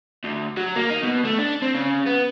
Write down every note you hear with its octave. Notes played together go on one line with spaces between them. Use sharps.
D2
F#3
A#3
D#4
B2
A3
D4
C4
C#3
B3